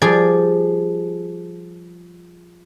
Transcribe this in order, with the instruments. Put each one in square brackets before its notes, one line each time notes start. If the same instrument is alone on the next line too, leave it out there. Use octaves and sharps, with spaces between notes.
[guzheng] F3 G3 G#4 D5